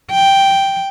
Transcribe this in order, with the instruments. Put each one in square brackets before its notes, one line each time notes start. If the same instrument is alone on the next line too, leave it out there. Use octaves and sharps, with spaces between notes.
[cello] G5